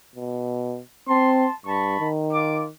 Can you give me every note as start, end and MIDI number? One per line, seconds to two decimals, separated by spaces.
0.15 0.80 47
1.08 1.46 60
1.08 1.51 81
1.08 1.51 84
1.66 1.96 43
1.66 2.06 81
1.66 2.06 83
1.66 2.06 85
2.00 2.69 51
2.32 2.62 65
2.32 2.62 86